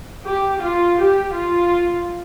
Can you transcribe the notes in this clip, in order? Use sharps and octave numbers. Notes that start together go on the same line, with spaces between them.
G4
F4
G4
F4